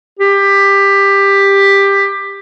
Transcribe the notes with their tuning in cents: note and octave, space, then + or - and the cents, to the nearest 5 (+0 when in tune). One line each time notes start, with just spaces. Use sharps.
G4 +15